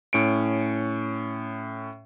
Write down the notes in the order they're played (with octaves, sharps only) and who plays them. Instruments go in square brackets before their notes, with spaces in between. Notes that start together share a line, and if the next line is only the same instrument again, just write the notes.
[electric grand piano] A2 C#4 C#7 D7